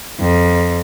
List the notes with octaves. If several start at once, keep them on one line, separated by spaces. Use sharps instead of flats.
F2